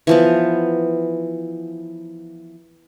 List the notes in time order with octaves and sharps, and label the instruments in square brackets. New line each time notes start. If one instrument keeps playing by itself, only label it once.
[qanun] E3 F3 B3